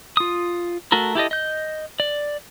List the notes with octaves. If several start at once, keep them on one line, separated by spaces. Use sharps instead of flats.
F4 D#6
A3 F#4 A4 A#4
E4 G4 A4 D#5
D#5 G6
D5